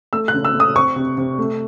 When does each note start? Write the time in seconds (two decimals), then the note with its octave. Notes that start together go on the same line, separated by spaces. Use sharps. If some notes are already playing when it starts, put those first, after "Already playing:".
0.13 A3 E6
0.28 F#6
0.34 C#3
0.45 E6
0.55 A3
0.60 D#6
0.76 C4 C#6
0.96 C3
1.18 C3
1.38 A3